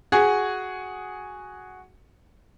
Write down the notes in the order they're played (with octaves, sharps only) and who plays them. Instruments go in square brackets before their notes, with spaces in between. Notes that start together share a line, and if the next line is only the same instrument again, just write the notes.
[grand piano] F#4 G#4